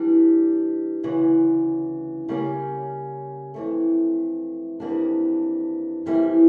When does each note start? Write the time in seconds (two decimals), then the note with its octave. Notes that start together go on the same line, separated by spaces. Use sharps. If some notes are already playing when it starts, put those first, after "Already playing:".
Already playing: E3 G3 D4
1.03 D2 C#3 E3
2.29 C#3 G3 A#3 C#4
3.54 F2 E3 A3
4.80 F2 E3 A#3 D4 G4
6.06 F2 E3 G3 A#3 E4